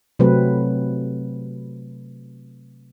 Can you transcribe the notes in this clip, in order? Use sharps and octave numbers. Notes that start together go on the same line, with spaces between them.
C3 F#3 A3 C4 B4